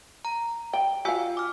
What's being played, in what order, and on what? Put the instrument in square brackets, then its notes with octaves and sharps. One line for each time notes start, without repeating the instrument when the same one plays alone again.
[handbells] A#5
[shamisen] G5
[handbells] F4 G#5 E6 [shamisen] F#4 F5
[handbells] D6 F6